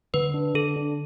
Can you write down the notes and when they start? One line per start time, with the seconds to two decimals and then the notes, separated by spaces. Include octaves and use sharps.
0.14 D3 B4
0.34 D4
0.54 D3 A4
0.76 D4